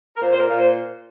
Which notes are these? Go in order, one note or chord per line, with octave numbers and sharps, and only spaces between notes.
A#4
A#2 C5
C5
A#4
A#2
C5